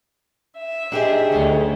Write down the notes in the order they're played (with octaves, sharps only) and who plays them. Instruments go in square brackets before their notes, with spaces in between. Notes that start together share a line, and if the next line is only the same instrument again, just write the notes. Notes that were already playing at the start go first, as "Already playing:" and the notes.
[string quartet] E5
[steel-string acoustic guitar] D4 G4 G#4 [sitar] D#4 C5
[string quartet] D2 [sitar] C#4